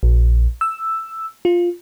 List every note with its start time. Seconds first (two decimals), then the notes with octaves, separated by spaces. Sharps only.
0.03 A#1
0.61 E6
1.45 F4